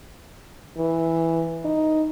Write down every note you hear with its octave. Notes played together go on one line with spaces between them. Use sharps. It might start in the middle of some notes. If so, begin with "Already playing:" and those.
E3
D#4